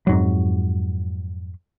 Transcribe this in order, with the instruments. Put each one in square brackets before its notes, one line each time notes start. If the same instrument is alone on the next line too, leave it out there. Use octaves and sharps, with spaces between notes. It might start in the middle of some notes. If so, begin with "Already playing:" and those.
[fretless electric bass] F2 G#2 F#3